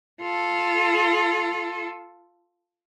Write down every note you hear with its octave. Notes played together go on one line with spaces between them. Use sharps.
F4 A4